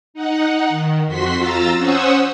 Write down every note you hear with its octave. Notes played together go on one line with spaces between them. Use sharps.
D#4 F#5
D#3
F2 F#4 C6 B6
F2 F4 A#5 E6 A6
C#4 C5 F#5 C#6 D#6 E6